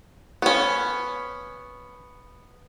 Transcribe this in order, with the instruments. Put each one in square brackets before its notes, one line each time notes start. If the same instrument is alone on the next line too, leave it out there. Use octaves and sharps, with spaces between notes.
[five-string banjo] B3 C#4